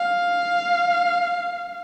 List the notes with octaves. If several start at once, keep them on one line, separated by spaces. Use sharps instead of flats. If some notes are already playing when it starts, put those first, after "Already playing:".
Already playing: F5